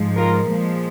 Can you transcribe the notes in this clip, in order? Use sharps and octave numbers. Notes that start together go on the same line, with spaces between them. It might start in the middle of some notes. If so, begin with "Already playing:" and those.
Already playing: G#2 F3 G#3
F4 A#4
A#2 F3 G#3